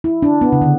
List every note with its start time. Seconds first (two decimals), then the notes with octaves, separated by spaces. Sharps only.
0.04 E4
0.22 D4
0.41 B3
0.52 C#3
0.62 D3